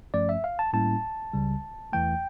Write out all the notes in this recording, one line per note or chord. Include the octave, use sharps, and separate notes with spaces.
G2 F3 A3 C#4 D5
E5
F5
A5
A2 G3 A#3 C#4 E4 A5
C#2 C#3 G3
E2 E3 A3 G5